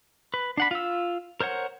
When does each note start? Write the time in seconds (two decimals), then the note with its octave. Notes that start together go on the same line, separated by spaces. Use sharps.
0.34 B4
0.57 D4 F#5 B5
0.71 F4 E6
1.40 A#4 C5 C#5 F#5